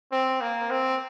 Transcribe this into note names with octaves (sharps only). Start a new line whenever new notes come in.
C4
A#3
C4